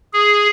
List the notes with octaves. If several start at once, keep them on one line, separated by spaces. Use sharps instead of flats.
G#4